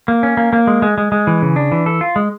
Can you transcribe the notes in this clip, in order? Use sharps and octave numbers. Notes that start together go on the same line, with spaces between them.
A#3
C#4
A#3
A#3
G#3
G#3
G#3
G#3
E3
C#3
D4
E3
A4
F4
G#3